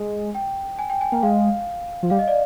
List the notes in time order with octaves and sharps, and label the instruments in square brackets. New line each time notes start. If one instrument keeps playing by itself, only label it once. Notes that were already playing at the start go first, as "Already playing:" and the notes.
Already playing: [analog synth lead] G#3
[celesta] G5
G#5
G5
G#5
[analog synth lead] A#3 [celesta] G5
[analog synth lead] G#3 [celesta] F5
[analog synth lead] F3
[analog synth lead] G3 [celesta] F5
[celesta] D#5
D5